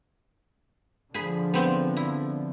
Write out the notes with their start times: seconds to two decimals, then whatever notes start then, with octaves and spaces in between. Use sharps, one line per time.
1.14 D3 F3 G#4 B5
1.54 B3 C4
1.97 E4